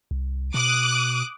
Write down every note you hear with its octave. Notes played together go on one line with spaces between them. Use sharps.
C2
B2 D6 D#6 F#6